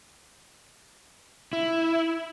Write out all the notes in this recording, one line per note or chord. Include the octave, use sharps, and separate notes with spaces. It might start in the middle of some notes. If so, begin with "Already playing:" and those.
E4